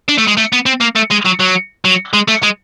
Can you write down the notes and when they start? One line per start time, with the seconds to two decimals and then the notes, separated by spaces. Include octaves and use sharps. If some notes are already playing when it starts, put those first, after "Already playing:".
0.08 D4
0.18 A3
0.27 G#3
0.37 A3
0.53 B3
0.66 C4
0.81 A#3
0.96 A3
1.11 G#3
1.26 F#3
1.40 F#3
1.85 F#3
2.14 G#3
2.28 A3
2.43 G#3